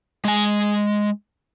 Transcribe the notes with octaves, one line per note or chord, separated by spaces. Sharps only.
G#3 G#5